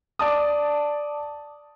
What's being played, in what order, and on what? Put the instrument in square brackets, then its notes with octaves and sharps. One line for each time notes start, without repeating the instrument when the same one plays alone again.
[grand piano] D5 A5 D#6